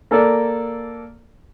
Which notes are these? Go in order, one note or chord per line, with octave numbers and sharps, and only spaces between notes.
A#3 A4 A#4 D5